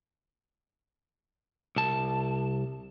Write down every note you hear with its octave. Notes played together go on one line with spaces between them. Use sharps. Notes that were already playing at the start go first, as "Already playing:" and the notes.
C2 A5